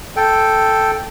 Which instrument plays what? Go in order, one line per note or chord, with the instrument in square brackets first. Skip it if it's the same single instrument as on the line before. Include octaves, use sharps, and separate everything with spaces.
[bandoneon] A4 G5